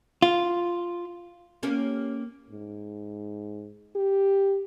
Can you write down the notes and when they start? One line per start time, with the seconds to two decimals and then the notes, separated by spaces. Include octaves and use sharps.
0.22 F4
1.63 A#3 C#4 G4
2.50 G#2
3.96 G4